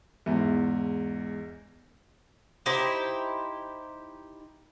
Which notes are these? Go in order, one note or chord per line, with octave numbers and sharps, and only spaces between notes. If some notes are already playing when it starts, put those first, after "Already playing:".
E2 G#2
D#4 E4 G4 C5